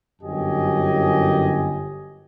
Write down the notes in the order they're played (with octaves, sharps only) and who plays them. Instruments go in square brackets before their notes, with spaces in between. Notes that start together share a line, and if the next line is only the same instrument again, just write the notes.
[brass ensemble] G1 F#2 G4 D#5 G#5